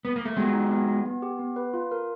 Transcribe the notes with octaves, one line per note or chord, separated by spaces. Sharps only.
B3
A#3
A3
F#3 G#3 B3
D#4
B3
B3
B3
G4
B3
B4
F4
A#4